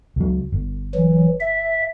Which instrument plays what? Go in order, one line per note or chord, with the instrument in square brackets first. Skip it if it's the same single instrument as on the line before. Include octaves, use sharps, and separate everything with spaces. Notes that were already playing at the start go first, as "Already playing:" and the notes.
[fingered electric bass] C#2 F#3
G1
[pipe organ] E3 F#3
E5